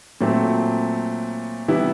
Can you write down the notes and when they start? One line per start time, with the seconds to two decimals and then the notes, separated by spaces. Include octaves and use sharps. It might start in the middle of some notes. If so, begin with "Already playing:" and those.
0.21 A#2 F#3 A3 C4
1.68 C3 E3 G3 B3 E4